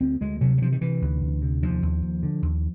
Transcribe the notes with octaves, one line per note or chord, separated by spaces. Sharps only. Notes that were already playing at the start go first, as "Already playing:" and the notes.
D2 C4
D2 G#3
C3 F#3
F#3
C3 F3
D#3
C3 E3
D2
D2
C3
D#2 F3
D#2
D#2
D3
D#2